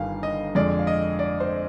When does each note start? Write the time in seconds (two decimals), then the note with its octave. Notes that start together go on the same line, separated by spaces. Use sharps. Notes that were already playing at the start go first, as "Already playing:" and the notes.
Already playing: G1 G2 D#3 G3 F5 G#5
0.23 D#5
0.55 F2 D3 G#3 D5
0.79 F5
0.87 D#5
1.19 D5
1.40 C5